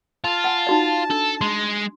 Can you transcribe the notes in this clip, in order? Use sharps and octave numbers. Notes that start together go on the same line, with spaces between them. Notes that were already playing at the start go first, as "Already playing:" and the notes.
F4 A5
F#5 G#5
D#4 F#4 D5
D4 A4
G#3 C6